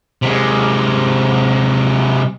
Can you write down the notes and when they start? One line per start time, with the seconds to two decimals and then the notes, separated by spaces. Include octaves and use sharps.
0.22 C3 G#3